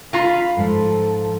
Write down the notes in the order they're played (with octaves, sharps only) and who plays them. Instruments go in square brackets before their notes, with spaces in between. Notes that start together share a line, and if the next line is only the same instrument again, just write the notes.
[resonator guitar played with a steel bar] F4 A#5 [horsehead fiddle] F5 B5
[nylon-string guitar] G#2 F3 [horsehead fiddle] A4